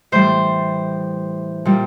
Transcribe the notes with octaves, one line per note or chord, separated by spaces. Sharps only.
A2 E3 G3 C5
A#2 G3